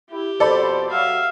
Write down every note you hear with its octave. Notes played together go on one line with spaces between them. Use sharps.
E4 G4
F2 B2 A4 C5 D5 B5
F#3 E5 F5